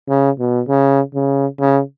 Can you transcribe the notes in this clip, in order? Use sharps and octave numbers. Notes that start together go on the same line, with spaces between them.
C#3
B2
C#3
C#3
C#3